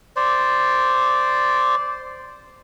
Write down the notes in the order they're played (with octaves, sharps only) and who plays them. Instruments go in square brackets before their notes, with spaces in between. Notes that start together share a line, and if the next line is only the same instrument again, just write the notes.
[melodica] C5 D5